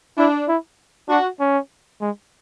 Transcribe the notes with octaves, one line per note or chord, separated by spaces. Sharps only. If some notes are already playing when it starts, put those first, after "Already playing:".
D4 E4
E4
D4 F#4
C#4
G#3